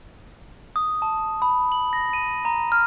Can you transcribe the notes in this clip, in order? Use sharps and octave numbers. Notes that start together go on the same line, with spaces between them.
D#6
A5
B5
F#7
A#6
D#7
A#5
F6